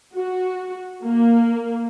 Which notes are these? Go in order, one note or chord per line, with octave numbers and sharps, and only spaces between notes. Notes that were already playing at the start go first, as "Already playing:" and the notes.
F#4
A#3